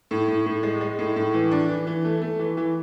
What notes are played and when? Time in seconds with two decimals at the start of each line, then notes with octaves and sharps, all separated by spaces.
0.11 A2
0.28 A2
0.46 A2
0.63 G#3
0.81 G#3
0.99 A2
1.16 A2
1.34 E3
1.51 D4
1.69 E3
1.87 E3
2.04 A3
2.22 A3
2.39 E3
2.57 E3